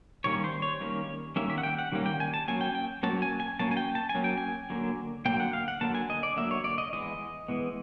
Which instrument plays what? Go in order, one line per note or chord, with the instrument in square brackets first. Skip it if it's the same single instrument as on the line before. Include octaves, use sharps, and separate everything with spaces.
[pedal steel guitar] D#3 G3 A#3 C#4 C#5
C5
C#5
D#3 G3 A#3 C#4
D#3 G3 A#3 C#4 E5
E5
F#5
G5
F#5
D#3 G3 A#3 C#4
G5
G#5
A5
F#3 A#3 C#4 G#5
G5
G5
F#3 A#3 C#4 A5
G#5
G#5
F#3 A#3 C#4 A5
G#5
G5
A5
G#5
F#3 A#3 C#4
G5
G#5
D3 F#3 A#3
D3 F#3 A#3 G5
F#5
F5
F#5
D3 F#3 A#3 A5
G#5
D#5
D5
D3 F#3 A#3 E5
C#5
D5
D#5
E3 G#3 B3 D#5
E3 G#3 B3